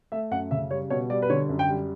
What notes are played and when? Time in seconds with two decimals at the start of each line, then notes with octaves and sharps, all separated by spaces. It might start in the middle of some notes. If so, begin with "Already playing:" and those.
0.12 A3 E5
0.31 F#2 F#5
0.51 C#3 E5
0.71 G3 C#5
0.90 B2 C#5
1.10 G3 D5
1.22 B4
1.30 D3 C#5
1.49 F#2
1.59 G5
1.69 G3